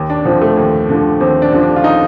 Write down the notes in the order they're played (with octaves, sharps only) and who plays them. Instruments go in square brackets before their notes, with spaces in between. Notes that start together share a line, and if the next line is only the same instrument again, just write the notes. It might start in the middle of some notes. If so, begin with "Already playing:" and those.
Already playing: [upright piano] D#2
D4
D3 F3 C4
A3
D#2
D3 F3
D#2 C4
D4
D3 F3
D4
F4
D#4